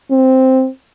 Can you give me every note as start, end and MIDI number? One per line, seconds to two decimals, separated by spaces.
0.11 0.68 60